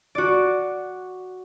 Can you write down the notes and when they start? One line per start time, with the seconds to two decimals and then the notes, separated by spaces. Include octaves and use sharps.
0.15 F#4 D5